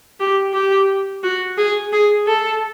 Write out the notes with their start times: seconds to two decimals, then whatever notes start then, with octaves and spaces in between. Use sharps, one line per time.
0.20 G4
0.54 G4
1.23 F#4
1.58 G#4
1.93 G#4
2.27 A4